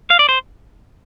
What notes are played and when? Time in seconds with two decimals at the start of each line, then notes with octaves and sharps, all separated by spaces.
0.10 F5
0.19 D5
0.29 C5